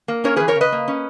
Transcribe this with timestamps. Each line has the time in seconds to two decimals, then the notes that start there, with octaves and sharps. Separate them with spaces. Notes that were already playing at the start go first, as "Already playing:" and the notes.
0.08 A#3
0.24 C#4 A#4 C#5
0.36 E3 G#4 B4
0.48 A#4 C#5
0.56 C#3
0.61 B4 D#5
0.72 A#3
0.88 C#4